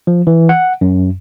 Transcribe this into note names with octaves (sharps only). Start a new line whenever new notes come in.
F3
E3
F#5
F#2